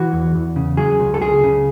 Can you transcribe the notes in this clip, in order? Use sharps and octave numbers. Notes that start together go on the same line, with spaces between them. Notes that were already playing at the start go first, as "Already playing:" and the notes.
Already playing: E3 F#4
E2
E2
C#3
F#3 G#4
C#2
A4
C#2 G#4
C#3